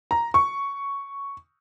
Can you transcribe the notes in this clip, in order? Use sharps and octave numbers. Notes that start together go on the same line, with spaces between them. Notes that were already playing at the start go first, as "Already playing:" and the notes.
A#5
C#6